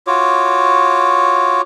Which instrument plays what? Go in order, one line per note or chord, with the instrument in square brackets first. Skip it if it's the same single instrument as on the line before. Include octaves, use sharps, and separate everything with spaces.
[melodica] F4 F#4 C#5 D6